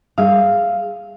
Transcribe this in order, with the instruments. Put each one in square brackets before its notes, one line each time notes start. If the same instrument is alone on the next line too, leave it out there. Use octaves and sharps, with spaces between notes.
[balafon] G3 [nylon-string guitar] G#4 F5